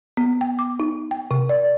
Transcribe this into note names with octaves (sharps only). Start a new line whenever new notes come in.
B3
G5
D6
D#4
G5
C3
D5